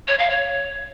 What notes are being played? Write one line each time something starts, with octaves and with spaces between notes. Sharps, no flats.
C#5
F5
C#5